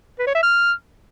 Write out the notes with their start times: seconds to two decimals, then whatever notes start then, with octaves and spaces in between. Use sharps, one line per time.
0.19 B4
0.27 C#5
0.35 E5
0.43 F6